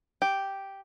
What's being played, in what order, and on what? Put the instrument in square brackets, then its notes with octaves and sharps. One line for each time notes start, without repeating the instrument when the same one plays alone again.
[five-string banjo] G4